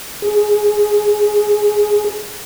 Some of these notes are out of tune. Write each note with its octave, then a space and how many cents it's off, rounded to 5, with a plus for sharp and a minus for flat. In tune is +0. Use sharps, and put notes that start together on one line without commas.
G#4 +5